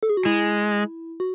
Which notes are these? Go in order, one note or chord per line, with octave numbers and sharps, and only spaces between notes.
A4
G#4
F#4
G#3 E4
F#4